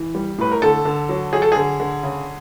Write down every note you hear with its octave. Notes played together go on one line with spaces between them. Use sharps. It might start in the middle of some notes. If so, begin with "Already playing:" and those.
Already playing: E3
G3
A2 B4
A#4
D3 A4
D3
F#3
F#3 G#4
A4
D3 G#4
D3
C#3